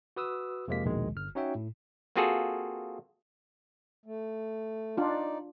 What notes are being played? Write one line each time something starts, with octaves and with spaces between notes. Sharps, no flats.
F#4 B4 D#6 E6
F2 C3 F3 G#3 A#3 B6
A#1 D#2 B2 D#3 G#3
G1 F6
C#4 D#4 F#4 C#5 E5 G5
A2
A#3 C4 F4 F#4 G#4 A4
A3
D4 D#4 F4 D5